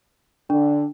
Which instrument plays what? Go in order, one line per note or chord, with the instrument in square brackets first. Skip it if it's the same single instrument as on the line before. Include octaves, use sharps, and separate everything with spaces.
[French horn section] D3 [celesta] D4